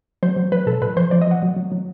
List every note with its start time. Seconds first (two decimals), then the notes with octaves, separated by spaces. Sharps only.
0.23 F#3 C5
0.36 F#3
0.52 F#3 B4
0.66 B2 A4
0.81 A#2 B4
0.96 F3 C5
1.11 F3 D5
1.22 D#5
1.27 F3 F#5
1.42 F#3
1.56 F#3
1.72 F#3